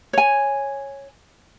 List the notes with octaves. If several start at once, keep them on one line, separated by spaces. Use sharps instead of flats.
C#5 G#5